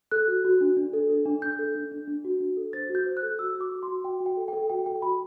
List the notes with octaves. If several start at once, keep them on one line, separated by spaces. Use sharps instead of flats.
A4 F#6
F#4
F#4
D4
D4
A4
A4
D4
D4 G6
A4
D4
D4
D4
F#4
D4
A4
C5 A6
F#4
G6
C5
F#6
A4
F#4 E6
F#4
D6
F#4
C6
F#4
F#4 G5
F#4
G5
A4
G5
A4
F#4 G5
A4 G5
F#4 B5